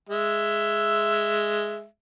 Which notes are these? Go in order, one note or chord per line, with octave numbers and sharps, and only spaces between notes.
G#3 E5